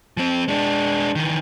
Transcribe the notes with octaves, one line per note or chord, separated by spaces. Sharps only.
F3 C4
G#3 D4
D#3 E3